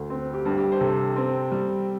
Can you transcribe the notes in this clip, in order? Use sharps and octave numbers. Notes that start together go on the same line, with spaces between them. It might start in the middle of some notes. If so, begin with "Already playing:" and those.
Already playing: D2
C4
G4
G2
G4
C5
C3 A4
C4
G3